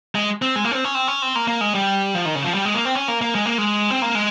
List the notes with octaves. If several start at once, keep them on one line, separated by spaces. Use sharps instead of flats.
G#3
C4
G#3
A#3
C#4
C4
C#4
C4
C#4
C4
A#3
A#3
G#3
G3
F3
D#3
C#3
F3
G3
G#3
A#3
C4
C#4
A#3
A#3
G#3
A#3
G#3
C4
A#3
G#3